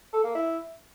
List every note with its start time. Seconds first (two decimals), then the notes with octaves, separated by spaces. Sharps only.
0.13 A4
0.24 A#3
0.35 E4